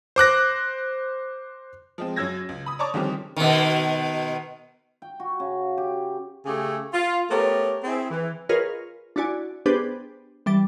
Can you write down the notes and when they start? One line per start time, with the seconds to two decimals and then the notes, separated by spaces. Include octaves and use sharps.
0.16 C5 D6 F#6 A#6
1.98 F3 G#3 C4
2.16 F#2 F#3 E6 G#6 A#6
2.49 C#2
2.66 B5 D#6
2.79 C#5 D5 A5 A#5 C#6 D6
2.94 D3 D#3 F3 G3 C4 C#4
3.36 B2 D#3
5.02 G5
5.20 F#4
5.40 C#3
5.78 G4
6.45 C#3 A3 G4 G#4
6.93 F4
7.31 A3 B3 G4 A#4 C#5
7.84 C4 E4 G#4
8.11 E3
8.49 F4 G#4 A#4 B4 C#5 D#5
9.16 D4 E4 F#4 D5 G#5
9.66 B3 D4 G4 G#4 B4 C5
10.46 E3 G3 A6